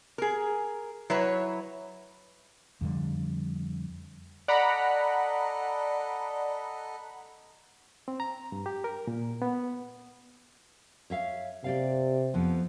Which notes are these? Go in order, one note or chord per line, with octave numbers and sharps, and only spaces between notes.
G#4 A#4
F#3 E4 B4 C#5
F2 D3 G3
A4 D5 D#5 F#5 A#5 B5
C4
A#5
G2
G4
A#4
A#2
B3
C#5 E5 F5
C3 G4 D5 F5
F2 F3 B3